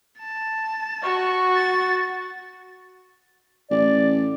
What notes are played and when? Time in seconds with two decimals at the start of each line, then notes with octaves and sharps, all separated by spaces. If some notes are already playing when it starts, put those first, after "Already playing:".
0.19 A5
1.03 F#4 C#6
1.56 A6
3.71 A1 D5